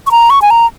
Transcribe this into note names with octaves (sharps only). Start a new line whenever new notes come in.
C#6
A#5
C#6
G#5
A#5